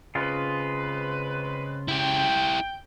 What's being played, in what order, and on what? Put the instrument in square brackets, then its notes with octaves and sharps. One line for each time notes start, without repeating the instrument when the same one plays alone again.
[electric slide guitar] C#3 F4 [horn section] G#3 C4 B4
[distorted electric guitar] E4 G4 [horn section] G5